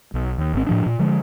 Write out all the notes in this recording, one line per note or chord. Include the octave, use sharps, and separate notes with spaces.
B1
D#2
G#1 C4
A2 F3 D4
A#2
D3 F3 G#3